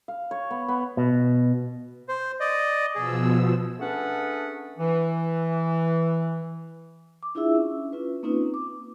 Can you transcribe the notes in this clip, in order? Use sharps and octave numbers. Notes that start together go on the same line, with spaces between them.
F5
C#5
B3
B3
B2
C5
D5 D#5
B2 F3 G#4 E6
A3 C#4 D4 G#4 B4 F#5
E3
D6
D4 E4 F4 G#4 E5 E6
C#4
C#4 F4 B4
A#3 C4 C#4 D#4 F4 B4
D6